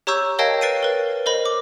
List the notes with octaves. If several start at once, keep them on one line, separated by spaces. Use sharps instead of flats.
G4 C#5 A#5 C#6 E6 G6
A#4 C#5 D#5 F5 G5 A5
B4 A6 C7 D7 D#7
A#4 B4
A#4 C5 D#5 B5
D6